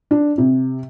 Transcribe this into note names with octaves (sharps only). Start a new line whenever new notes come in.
D4
C3